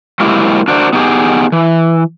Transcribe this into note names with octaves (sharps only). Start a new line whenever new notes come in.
F#3 G#3 A#3 C4 E4 G4
D4 F#4 A#4 C5 D5
B3 D#4 G4 G#4
E3